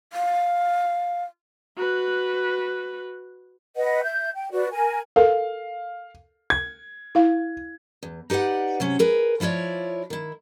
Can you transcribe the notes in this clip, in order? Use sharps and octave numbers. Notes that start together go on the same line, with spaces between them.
F5
F#4 B4
B4 D#5 F#5
E5 G6
G5
F#4 B4 D5
A#4 G#5
A4 A#4 F5
G#6
E4 F5
E2
D#4 G4 B4 D5 F#5
C3 F#3 C#4
G#4 A#4 B4
F3 E4 F4 C#5 D5
D#3 E4